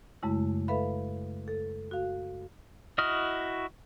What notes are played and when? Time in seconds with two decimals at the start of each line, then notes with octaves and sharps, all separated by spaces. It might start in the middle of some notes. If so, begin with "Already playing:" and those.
0.23 F#2 C#3 G#3 A3 E4
0.68 A4 B4 E5 F5 B5
1.48 A4
1.91 F#4 F5
2.98 E4 F#4 D#5 D#6 F6